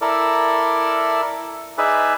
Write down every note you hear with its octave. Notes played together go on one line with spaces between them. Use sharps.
E4 A4 A#4 D5
D#4 G#4 B4 D5 E5